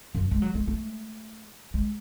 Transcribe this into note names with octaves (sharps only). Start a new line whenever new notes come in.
F#2
G#3
F#3
G#3
A3
G#3